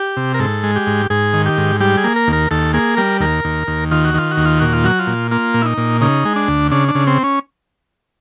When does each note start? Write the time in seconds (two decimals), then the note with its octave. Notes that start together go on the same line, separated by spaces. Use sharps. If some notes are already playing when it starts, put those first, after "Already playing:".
Already playing: G4
0.17 C3
0.34 A#4
0.39 G#2 A4
0.63 G#3
0.76 G4
0.87 G#2
1.10 G#2 G#4
1.33 D#3
1.46 G4
1.58 G#2
1.80 G3 G4
1.97 G#4
2.04 A#3
2.16 A#4
2.28 D#2
2.33 A#4
2.51 D#2 A4
2.74 A#3 G#4
2.97 G3 A#4
3.20 D#2 A#4
3.45 D#2
3.67 D#2
3.91 D#3 F4
4.05 F#4
4.14 D#3 F4
4.31 F#4
4.37 D#2
4.45 F4
4.59 A#2 F#4
4.73 F4
4.84 F#3 F#4
4.99 F4
5.07 A#2
5.31 A#3 F4
5.54 A#2
5.62 E4
5.66 D#4
5.77 A#2
6.01 C#3 D#4
6.25 G#3
6.36 D4
6.48 D2
6.71 C#3 D4
6.88 D4
6.95 C#3
7.07 C4
7.24 C#4